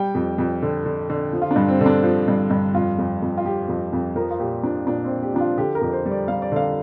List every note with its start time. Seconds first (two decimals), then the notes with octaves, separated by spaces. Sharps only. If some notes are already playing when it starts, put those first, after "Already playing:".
Already playing: G3 G5
0.15 F2
0.38 F2
0.62 D3
0.86 D3
1.10 D3
1.33 F3
1.42 F4
1.51 D4
1.56 G2
1.68 C4
1.81 D3
1.86 D4
2.03 F3
2.28 G2
2.50 G2
2.75 F2 F4
2.99 F2
3.22 F2
3.37 F4
3.45 F3 G4
3.69 F2
3.93 F2
4.16 F3 A#4
4.31 F4
4.39 A#2 G4
4.63 F3 D4
4.87 A#2 D4
5.05 C4
5.10 A#2
5.23 G4
5.34 F3 D4
5.41 F4
5.58 D3 G4
5.75 A#4
5.82 F2
5.93 C5
6.06 G3
6.11 D5
6.28 G3 F5
6.42 D5
6.52 D3 F5